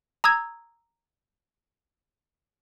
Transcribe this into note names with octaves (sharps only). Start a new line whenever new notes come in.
A#5 D#6 E6 G#6